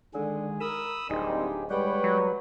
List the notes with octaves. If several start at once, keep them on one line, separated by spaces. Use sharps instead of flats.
D3 D#3 G#3 G#4
A#4 B5 D#6 E6
D1 D#3 G3 C4 D4 D#4 G4 G#4
G3 G#3 B4 C#5 F#5 G5
F#3